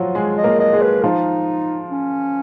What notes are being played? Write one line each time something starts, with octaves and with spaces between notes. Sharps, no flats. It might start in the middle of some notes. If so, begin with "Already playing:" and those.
Already playing: F3 F#3 F4 F#4
G#3 G#4
D#5
A#3 A#4
D#5
G#3 G#4
B4
F3 D#4 F4
C#4